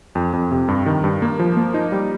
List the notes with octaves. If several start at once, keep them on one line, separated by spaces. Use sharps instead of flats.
F2
F2
C3
G2
D#3
G2
A#3
F3
A#3
D#4
G3